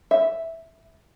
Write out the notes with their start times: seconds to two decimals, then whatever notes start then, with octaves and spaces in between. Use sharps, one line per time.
0.11 E5